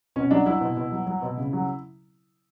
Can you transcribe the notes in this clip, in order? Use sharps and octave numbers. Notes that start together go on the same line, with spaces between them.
B2 C#4
F#3 D4
F#3 E4
B2
B2
F#3
F#3
B2
C#3
F#3